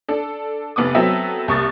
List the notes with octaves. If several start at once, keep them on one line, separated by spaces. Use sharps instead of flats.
D4 A4
F1 B3 D6 D#6
F#3 B3 C4 A4 E5
C2 A#3 C#6 D#6 A6